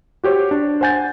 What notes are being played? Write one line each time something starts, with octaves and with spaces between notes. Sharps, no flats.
F#4 G4 C5 C#5
D4
C5 F#5 G#5 G6 A6